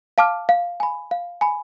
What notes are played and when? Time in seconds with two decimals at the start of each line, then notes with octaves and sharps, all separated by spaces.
0.18 F5 A5 D6 F6
0.49 F5
0.80 G#5 B5
1.11 F5
1.41 G#5 B5